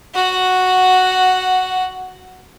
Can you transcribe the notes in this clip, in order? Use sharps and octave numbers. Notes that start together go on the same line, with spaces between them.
F#4 F#5